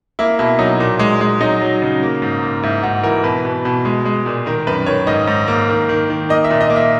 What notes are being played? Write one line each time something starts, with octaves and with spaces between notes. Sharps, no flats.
A#3 E4
B2 E4
F#3 D#4
A#2
G#3
G#3
F#3 D#4
F#3
C#3
A#3
G#2
A#3
G#2 E4
G#2 F#4
E3 A#4
B2 B4
B2
B2
G#3
G#3
A#2
D#3 A#4
F#2 B4
D#3 C#5
G#2 D#5
G#2
A#3
D#3
D#3
D#3
A#3 D#5
E5
A#2
D#5
A#3
E5